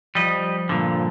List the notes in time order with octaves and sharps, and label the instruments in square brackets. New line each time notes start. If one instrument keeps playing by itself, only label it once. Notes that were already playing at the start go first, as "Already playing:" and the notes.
[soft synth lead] F3 [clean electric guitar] G3 D#5
[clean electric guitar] G2 A#2 D3